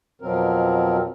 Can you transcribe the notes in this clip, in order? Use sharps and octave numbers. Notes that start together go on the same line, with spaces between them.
F2 B2 F3 F#3 C4 A#4